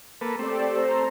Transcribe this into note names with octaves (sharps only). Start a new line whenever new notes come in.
A#3 A4 B4
A3 C4 G4 A4 D5
A4 C5 A#5